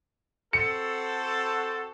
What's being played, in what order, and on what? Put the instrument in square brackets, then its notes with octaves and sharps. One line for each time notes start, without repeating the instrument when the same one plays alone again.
[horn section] C4 F#4 A4 [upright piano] C#7